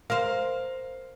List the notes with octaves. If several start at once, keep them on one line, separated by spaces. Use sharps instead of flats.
A#4 C5 F5 F6